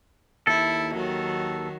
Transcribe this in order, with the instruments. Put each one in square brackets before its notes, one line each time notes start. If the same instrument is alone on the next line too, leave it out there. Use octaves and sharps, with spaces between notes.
[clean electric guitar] D#2 A4 [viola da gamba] E4
[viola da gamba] D#3 F#3